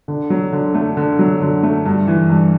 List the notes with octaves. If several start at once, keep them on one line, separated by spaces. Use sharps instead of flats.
D3
F#3
D3
A3
D3
F#3
D3
A3
G2
E3
G2